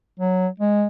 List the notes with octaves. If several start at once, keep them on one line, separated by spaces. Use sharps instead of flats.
F#3
G#3